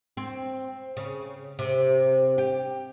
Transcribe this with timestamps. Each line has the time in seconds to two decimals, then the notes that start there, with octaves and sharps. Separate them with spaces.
0.17 C4
0.97 C#3
1.59 C3
2.38 G4